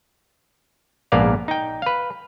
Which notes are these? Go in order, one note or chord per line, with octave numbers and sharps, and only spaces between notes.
A#1 G#2 A#3 B3 D5 F5
D#4 G5
B4 F5